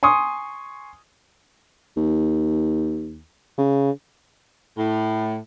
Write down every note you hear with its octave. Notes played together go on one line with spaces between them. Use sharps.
G#5 C6 C#6 D#6
D#2
C#3
A2